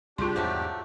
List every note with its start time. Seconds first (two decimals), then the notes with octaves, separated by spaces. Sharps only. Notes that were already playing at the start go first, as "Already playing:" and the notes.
0.18 C2 G2 D4 F4 G4 G#4 C6
0.36 E2 G#2 F3 F#3 A3